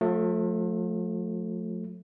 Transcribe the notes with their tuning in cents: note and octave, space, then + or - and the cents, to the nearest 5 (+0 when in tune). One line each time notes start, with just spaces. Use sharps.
F3 +40 A3 +0